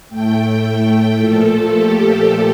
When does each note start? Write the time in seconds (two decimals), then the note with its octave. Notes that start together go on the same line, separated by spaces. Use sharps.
0.09 A2 A3 G5
1.16 A#2 F3 A3 A4
1.70 G4